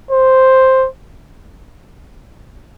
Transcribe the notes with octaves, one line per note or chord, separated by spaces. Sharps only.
C5